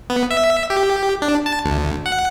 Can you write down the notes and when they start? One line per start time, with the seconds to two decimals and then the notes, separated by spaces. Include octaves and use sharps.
0.10 B3
0.31 E5
0.70 G4
1.22 D4
1.46 A5
1.65 D2
2.06 F#5